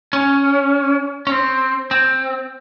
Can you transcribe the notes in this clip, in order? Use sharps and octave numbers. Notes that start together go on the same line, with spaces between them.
C#4
C#4
C4
C4